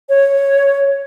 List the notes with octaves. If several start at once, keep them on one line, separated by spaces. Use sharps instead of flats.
C#5